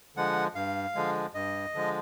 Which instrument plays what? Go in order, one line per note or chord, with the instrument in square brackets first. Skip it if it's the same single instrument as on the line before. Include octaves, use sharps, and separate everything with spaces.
[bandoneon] D3 F3 G#3 F#5
G2 F5
D3 F3 G#3
G2 D#5
D3 F3 G#3